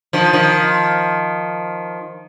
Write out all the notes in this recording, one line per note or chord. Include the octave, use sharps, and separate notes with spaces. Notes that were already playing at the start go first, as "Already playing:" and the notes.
D#3 F3
D#3 F3